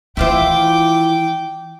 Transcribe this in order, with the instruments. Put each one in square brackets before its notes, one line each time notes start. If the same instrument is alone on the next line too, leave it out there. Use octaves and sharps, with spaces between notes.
[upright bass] D#3 E3 [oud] E4 F4 C5 [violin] G5 D6